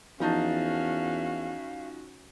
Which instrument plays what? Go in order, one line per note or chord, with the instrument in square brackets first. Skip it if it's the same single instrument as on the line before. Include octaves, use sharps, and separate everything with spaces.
[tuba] E2 [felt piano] F3 D#4 A5 [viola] C#4 F#4 [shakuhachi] F5